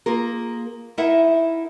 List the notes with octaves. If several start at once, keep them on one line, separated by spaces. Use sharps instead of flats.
A#3 F4 G#4 A#4
D#4 E4 A#4 E5 F#5